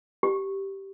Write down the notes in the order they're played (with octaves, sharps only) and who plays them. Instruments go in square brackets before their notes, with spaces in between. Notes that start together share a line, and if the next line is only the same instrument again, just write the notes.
[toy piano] G4